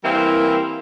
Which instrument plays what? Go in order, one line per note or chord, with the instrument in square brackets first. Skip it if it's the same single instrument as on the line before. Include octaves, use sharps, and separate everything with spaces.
[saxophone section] E3 G3 A#3 C4 E4 A#4